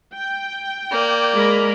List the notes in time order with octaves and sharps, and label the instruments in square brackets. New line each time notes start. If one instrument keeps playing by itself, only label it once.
[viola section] G5
[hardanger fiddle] A#3 D5
[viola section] G#3 A#4 B5